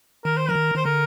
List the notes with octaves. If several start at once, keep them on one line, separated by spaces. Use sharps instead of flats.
D#3 A#4
C5
F3 A#4
D#3
D#3 C5
D3 A#4